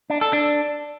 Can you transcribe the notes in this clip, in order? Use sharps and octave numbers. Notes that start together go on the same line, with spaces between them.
D4
A4
D4